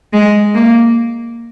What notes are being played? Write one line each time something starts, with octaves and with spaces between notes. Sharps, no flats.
G#3
A#3